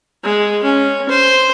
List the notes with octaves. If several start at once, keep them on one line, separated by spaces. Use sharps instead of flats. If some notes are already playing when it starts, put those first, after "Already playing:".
G#3
C#4
C5